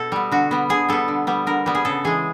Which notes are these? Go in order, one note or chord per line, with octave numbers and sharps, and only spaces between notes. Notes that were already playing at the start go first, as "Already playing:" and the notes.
Already playing: B2 A4
G3 B3
D3 F#4
G3 B3
D3 G#4
G3 B3 A4
D3
G3 B3
D3 A#4
G3 B3
G#4
C#3 A4
E3 G#3 G#4